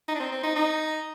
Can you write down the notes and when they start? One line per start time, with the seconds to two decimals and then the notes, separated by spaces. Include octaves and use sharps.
0.08 D#4
0.15 D4
0.20 C4
0.32 C4
0.43 D#4
0.56 D#4